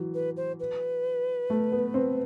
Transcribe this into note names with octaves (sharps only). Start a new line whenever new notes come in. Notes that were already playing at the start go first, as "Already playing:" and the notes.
Already playing: E3 F#3
B4
C5
B4
A3
B3
C4